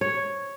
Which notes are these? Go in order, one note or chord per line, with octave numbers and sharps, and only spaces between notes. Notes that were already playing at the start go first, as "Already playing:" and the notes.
C#5